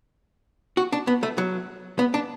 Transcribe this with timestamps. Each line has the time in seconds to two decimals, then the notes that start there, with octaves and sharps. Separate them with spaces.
0.77 F#4
0.93 D4
1.07 B3
1.23 A3
1.38 F#3
1.99 B3
2.14 D4